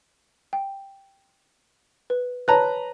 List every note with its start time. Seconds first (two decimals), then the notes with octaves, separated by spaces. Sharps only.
0.53 G5
2.10 B4
2.48 B4 C#5 A5 A#5 F#6